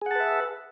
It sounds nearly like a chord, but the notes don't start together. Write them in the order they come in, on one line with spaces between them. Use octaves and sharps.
G#4 F#5 A5 B4 E5